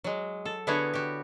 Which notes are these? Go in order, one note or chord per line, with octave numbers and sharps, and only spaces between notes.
F#3 G#3
A4
D3 B3 E4 F#4 G#4 C#5
F#4 G4